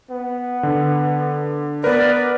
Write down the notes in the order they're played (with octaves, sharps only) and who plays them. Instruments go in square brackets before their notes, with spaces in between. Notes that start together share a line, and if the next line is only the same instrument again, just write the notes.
[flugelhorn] B3
[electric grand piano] D3
[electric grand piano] B3 A#4 [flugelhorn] B4 [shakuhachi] D5